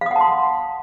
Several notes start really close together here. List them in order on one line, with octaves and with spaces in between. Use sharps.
F5 D#6 F#5 A5 C6